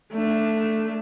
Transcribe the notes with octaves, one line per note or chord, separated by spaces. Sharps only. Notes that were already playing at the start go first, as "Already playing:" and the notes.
A3 D4